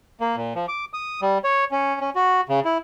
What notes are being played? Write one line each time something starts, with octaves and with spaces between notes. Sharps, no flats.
A#3
A#2
F3
D6
D#6
G3
C#5
C#4
C#4
F#4
C#3
E4